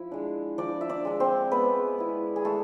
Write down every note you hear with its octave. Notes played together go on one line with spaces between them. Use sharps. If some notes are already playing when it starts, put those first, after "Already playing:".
Already playing: F3 E4
G#3 D4
F3 D4 D5
E5
D4 D5
G#3 D4
C4 C5
G#3 B3 B4
B3 E4
G#4
G#3 A3 A4